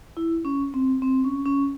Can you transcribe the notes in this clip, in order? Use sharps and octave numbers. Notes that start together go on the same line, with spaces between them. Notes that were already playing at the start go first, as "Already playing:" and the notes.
E4
C#4
C4
C4
C#4
C#4